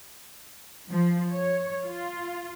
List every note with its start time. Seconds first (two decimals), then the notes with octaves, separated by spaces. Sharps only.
0.89 F3
1.31 C#5
1.85 F4